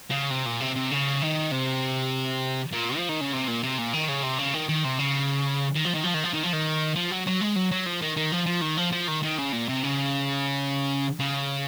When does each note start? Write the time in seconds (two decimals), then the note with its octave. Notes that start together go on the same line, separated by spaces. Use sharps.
0.10 C#3
0.30 C3
0.46 A#2
0.60 C3
0.76 C3
0.91 C#3
1.22 D#3
1.52 C3
2.72 A#2
2.96 F3
3.09 D#3
3.21 C#3
3.33 C3
3.48 A#2
3.63 C3
3.78 A#2
3.94 D#3
4.09 C#3
4.23 C3
4.39 C#3
4.54 D#3
4.69 D#3
4.84 C3
4.99 C#3
5.75 D#3
5.85 F3
5.94 D#3
6.04 F3
6.14 D#3
6.24 F3
6.33 D#3
6.43 F3
6.53 D#3
6.95 F3
7.11 F#3
7.27 F#3
7.41 G#3
7.56 F#3
7.71 F#3
7.86 F3
8.01 D#3
8.17 D#3
8.32 F3
8.46 F3
8.62 D#3
8.78 F3
8.92 F3
9.08 D#3
9.23 D#3
9.38 C#3
9.52 A#2
9.69 C3
9.84 C#3
11.20 C#3